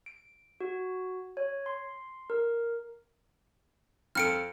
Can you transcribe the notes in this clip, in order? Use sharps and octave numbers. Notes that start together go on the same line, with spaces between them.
D7
F#4
C#5
C6
A#4
F2 A4 F6 C#7 D7